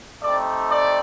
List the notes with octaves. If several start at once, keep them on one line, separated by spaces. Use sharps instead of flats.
A3 C4 D#4 G4 D5
D5